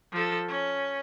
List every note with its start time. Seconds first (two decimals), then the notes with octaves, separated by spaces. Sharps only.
0.12 F3 A4
0.49 C#4